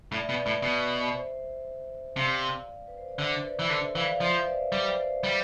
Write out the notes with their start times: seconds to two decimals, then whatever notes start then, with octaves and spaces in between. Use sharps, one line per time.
0.12 A2 D5
0.22 E5
0.29 B2
0.33 B4 D5
0.46 A2
0.62 B2
1.14 C5 E5
2.16 C3 D5 F5
2.87 B4
2.98 C5
3.08 D5
3.18 D3 C5 E5
3.44 B4 D5
3.59 E3
3.70 D3 A4 C5
3.83 C5 E5
3.95 E3 D5 F5
4.08 D5 F5
4.21 F3 C5 E5
4.31 F5
4.39 E5
4.46 B4 D5
4.72 G3 E5
4.81 D5
4.89 C5 E5
5.24 G3